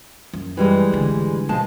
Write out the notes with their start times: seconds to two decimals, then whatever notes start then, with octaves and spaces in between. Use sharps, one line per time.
0.33 F#2
0.57 E3 G3 G#3
0.92 A1 D3
1.49 B2 F3 G#3 A5